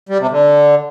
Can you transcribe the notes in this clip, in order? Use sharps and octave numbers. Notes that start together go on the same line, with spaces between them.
G3
C3
D3